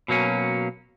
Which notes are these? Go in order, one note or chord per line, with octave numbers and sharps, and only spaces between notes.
B2 F#3 A#3 C#4